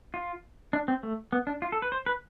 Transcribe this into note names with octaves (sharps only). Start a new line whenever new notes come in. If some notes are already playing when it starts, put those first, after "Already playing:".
F4
D4
C4
A3
B3
D4
F4
A4
B4
C5
B4